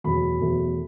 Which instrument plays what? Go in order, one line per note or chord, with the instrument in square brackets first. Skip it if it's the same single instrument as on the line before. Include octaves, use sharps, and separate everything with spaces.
[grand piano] E2 B2 F#3 A3 B5
E2 B2 F#3 A3